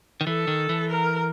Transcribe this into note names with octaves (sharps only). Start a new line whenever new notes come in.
D#3
E3 A4
D#3
E3
A#4